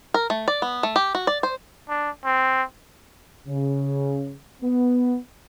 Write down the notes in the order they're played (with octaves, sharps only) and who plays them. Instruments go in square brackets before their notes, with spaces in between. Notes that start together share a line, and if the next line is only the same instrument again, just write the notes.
[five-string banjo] A#4
A3
D5
B3
A3
G4
F#4
D5
C5
[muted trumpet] D4
C4
[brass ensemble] C#3
B3